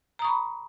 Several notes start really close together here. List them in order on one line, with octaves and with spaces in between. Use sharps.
A#5 D#6 C#6 B5